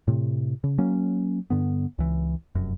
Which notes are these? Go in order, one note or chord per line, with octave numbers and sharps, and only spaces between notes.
A2 C3
C#3
F#3 A#3 C#4
G2 D3 B3
C#2 E3
F1 F#2